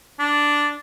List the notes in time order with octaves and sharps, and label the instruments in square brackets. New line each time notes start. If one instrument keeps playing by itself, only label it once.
[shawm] D4